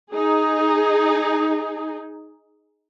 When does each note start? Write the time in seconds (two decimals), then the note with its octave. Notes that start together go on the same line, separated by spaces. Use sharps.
0.12 D#4 G#4